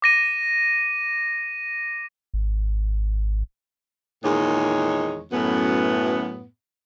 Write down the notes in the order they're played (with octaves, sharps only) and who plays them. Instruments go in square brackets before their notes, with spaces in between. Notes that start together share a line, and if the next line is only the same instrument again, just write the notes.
[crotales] D6 A#6 D#7
[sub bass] G#1
[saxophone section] E2 A#2 D#3 G#3 D#4 C#5
F#2 A2 B3